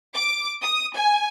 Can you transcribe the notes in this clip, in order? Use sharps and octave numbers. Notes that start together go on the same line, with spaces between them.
D6
D#6
G#5